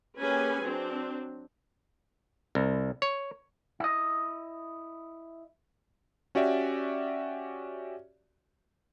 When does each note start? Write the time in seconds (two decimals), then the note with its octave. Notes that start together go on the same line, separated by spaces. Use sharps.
0.20 A#3 C#4 G4 G#4 B4 G#5
0.62 F#3 C4 D4
2.55 C2
3.02 C#5
3.80 E4 D#5
6.35 C#4 F#4 G4 D5 E5